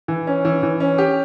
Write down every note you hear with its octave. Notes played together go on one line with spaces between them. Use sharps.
E3
C#4
E3
E3
C#4
G4